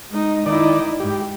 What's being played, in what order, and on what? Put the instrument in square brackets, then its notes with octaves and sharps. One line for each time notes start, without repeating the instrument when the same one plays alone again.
[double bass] G#3 D#4
[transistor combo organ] D#3 D5 [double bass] D#4 E4
[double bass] G#2 [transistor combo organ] G4